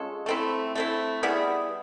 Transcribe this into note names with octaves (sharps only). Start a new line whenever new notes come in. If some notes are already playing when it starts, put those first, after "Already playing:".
Already playing: G#3 C#4 F4 A4
A3 C4 E4
A3 C4 E4
G3 B3 E4 G#4